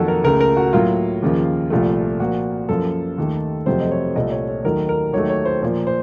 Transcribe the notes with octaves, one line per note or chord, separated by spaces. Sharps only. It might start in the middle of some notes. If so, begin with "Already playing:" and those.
Already playing: F2 D#3 F#3 A#3 F#4 A4
A#4
C#2 C#3 A3 A#4
A#4
F#4
A2 F#3 A#3 F4
D#2 C#3 F3 A#3
C2 A#2 F3 A3
A#2 F3 A#3 F#4
F#2 F3 A#3 A4
D#2 D#3 A3
F2 C3 F#3 A3 C5
D#5
C#5
C2 A#2 A3 D#5
C#5
C#5
D#2 D#3 F#3 A3 A#4
A#4
D#2 D#3 F#3 A3 C#5
C#5
C5
A#2 F3 A#3 C5
C5